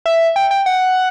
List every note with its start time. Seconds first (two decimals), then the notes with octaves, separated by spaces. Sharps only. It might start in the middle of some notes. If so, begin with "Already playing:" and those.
0.06 E5
0.36 G5
0.51 G5
0.66 F#5